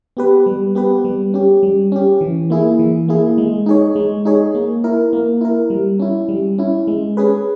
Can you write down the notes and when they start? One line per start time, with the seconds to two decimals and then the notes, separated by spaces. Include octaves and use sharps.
0.17 B3 G4 B4
0.46 G3
0.75 B3 G4 B4
1.05 G3
1.34 C#4 G4
1.63 G3
1.92 C#4 G4
2.21 E3
2.50 A#3 E4 G#4
2.79 E3
3.08 A#3 E4 G#4
3.38 G#3
3.66 D#4 G#4 C#5
3.96 G#3
4.25 D#4 G#4 C#5
4.55 A#3
4.84 E4 A#4
5.13 A#3
5.41 E4 A#4
5.70 G3
5.99 C#4 E4
6.29 G3
6.58 C#4 E4
6.87 G#3
7.17 C#4 G#4 B4